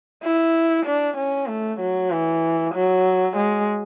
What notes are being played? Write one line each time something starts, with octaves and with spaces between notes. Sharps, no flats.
E4
D4
C#4
A3
F#3
E3
F#3
G#3